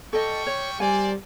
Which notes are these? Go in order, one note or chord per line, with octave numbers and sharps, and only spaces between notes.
G3 A4 D#5 G5 C#6
C#5
G3 A#4 C5 D5 G#5